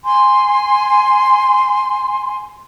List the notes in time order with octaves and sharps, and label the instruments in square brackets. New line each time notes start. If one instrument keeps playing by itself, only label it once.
[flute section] G#5 C6